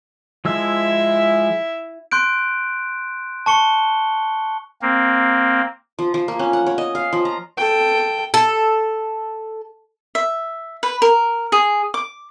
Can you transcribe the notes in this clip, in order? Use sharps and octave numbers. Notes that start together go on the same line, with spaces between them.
F3 G#3 E4 E5 E6
C6 F#6 G6 D7
A5 C#6 C#7 G7
A#3 C4
F3
F3
A#3
C#4
F#5
C#5
D#5
F5
F3
A#5
A4 G5
A4
E5
B4
A#4
G#4
D6